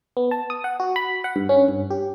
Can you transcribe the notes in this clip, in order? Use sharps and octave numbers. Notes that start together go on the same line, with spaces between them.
B3
A5
D#6
F#5
F#4
B5
F#5
G2
C#4
G2
G4